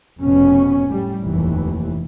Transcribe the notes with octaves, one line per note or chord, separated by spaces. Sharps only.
F1 B2 C#4
A2 G3
F1 D#2 E3